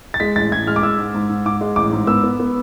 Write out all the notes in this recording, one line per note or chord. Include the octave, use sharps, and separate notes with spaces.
A6
G#3 B6
A1 A6
A1 G#6
G#3 F6
D6
G#3 E6
G#2
G#2
G#2
G#2 D6
G#3
A1 D6
G#2
B3 E6
B3
B3